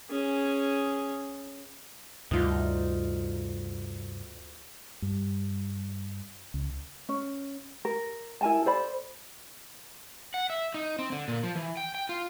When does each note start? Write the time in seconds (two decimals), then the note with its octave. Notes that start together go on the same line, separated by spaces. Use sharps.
0.10 C#4 G#4
2.31 D2 G2 C3 G3 D#4 F4
5.02 G2
6.54 C#2
7.09 C#4
7.85 A#4
8.41 E4 A#4 G#5 A5
8.65 A4 C5 D5 B5
10.34 F#5
10.50 E5
10.74 D#4
10.99 C4
11.12 D3
11.28 A#2
11.43 F3
11.55 E3
11.77 G5
11.95 G5
12.09 F4